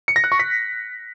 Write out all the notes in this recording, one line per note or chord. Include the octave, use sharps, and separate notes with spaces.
C#7
A#6
F#6
C#6
B6